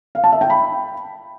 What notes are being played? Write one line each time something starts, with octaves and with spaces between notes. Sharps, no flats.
F5
A5
E5
G5
B5